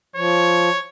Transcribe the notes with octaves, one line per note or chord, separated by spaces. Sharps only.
F3 C#5